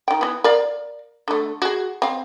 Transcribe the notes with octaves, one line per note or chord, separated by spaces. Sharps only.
D#3 G5
E3 B3
A#4 D5 F5
D3 A3
F#4 G#4
C4 F5